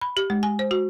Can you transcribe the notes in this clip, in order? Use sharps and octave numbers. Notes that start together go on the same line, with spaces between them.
B5
G4
G#3
G#5
C5
F#4